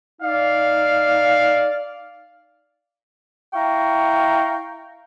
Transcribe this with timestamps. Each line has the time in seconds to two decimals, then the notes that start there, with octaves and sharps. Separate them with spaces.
0.22 D#4 D5 F5
3.54 E4 F5 G5 A#5 C#6